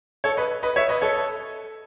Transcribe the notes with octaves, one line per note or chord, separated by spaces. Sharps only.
A4 C#5
B4 D#5
B4 D#5
C#5 E5
B4 D#5
A4 C#5